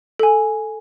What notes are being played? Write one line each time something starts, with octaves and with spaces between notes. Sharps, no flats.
A4 G#5